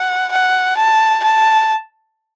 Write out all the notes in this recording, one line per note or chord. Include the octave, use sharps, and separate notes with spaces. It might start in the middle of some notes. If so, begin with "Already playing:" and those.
Already playing: F#5
F#5
A5
A5